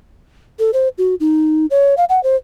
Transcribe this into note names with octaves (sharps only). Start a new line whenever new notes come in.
A4
C5
F#4
D#4
C#5
F5
F#5
C5